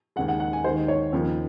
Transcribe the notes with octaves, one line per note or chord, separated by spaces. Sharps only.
D#2 C#3 G#3 F#5
F#5
F#5
G#5
D#2 D#3 G#3 C5
C#5
D#2 C#3 F3 A#3